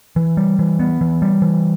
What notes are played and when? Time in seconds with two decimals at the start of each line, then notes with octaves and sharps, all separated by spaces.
0.16 E3
0.37 G3
0.59 E3
0.79 B3
1.01 E3
1.22 G3
1.42 E3